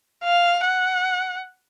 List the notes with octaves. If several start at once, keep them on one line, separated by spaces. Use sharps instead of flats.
F5
F#5